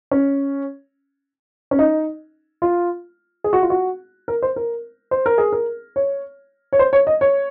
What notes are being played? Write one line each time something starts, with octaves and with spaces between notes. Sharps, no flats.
C#4
C#4
D#4
F4
G#4
F#4
F4
F#4
A#4
C5
A#4
C5
A#4
G#4
A#4
C#5
C#5
C5
C#5
D#5
C#5